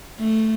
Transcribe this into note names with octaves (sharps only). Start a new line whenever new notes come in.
A3